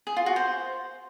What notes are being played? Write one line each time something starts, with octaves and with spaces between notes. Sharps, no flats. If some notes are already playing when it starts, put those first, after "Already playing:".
G#4
F4
F#4
C5